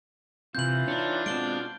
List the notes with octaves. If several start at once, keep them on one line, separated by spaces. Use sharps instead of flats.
C3 E3 C4 F4 G6 F#7
D4 D#4 C#5
B2 G#3 C4 F4 D7 G7